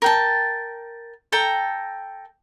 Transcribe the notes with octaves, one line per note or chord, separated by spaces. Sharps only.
A#4 G5 A5
A4 G5 A#5